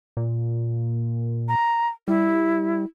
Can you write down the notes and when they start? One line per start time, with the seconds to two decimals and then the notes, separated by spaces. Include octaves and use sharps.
0.17 A#2
1.48 A#5
2.08 G3 E4